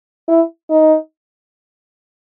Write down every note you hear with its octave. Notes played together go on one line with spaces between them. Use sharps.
E4
D#4